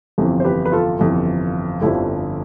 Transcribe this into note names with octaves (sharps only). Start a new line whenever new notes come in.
G1 F2 C3 E3
C5
G4 B4
B4
F4 A4
G1 F2 C3 E3
G1 F2 D3 F3 E4 G4